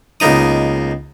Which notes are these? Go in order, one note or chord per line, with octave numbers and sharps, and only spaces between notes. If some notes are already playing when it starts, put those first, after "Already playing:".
C#2 A#3 B3 D#4 D#6